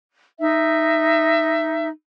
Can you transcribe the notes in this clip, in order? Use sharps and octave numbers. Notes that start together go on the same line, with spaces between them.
D#4 E5